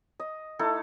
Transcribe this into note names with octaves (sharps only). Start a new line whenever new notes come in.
D#5
A3 D#4 E4 A4